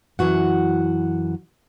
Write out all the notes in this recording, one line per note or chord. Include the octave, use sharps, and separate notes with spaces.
F#2 E3 F#4 F#5